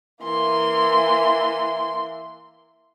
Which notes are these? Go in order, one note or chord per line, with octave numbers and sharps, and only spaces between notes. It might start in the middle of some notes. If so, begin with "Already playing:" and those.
E3 A#3 C6